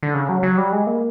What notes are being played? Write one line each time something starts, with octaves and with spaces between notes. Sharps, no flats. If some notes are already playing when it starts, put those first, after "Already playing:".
D3
C#3
F#3
F#3
G3
G#3
A#3